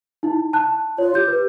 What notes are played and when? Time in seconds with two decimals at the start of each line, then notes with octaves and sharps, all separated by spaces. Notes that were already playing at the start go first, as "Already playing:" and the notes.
0.23 D#4 E4
0.53 A5 F#6
0.98 F4 C#5
1.15 G4 G6
1.28 B4